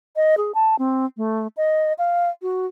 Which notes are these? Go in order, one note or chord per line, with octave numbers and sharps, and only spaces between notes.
D#5
G#4
A5
C4
A3
D#5
F5
F#4